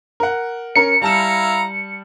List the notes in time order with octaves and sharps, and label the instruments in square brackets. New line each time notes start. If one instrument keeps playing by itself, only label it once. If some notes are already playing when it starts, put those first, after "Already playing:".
[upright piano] A#4 F#5
[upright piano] C#4 A#4 [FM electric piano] C#7
[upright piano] G3 A5 E7 [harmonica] E4 F5 A#5